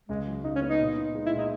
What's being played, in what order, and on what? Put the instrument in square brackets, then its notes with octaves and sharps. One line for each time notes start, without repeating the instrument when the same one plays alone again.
[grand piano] C#2 [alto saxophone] G#3
[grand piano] F#3
[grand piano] C#3 [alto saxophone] D#4
[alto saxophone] C#4
[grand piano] B3
[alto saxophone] D#4
[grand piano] A#2
D#4
G#3
[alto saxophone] E4
[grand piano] A#2
[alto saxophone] D#4